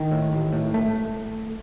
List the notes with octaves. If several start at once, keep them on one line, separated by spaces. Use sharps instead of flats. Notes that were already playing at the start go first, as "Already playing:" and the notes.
Already playing: D#3
A2
A1
A2
A3